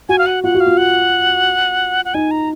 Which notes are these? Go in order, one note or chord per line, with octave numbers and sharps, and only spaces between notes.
F#4 G#5
F5
F#5
F4 F#5
F#4
F5
F4
F#5
F#5
D#4 G#5
A#5